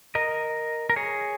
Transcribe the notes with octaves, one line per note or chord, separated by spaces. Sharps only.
A#4 D#5
A#4
G#4 C#5